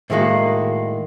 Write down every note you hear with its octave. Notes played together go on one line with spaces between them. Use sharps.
A2 D#3 G#3 A#3 F#4